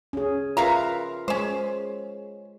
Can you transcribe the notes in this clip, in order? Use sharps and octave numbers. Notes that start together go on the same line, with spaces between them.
C#4 G#4
F4 A#4 B4 E5 F5 A#5
G#3 C#4 C5